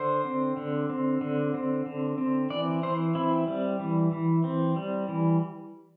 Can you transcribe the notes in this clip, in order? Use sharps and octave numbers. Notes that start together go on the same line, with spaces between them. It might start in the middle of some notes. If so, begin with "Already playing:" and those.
Already playing: D3 C5
C4
D3
C4
D3
C4
D3
C4
E3 D5
E3 C5
C4 E4
G3
E3
E3
C4
G3
E3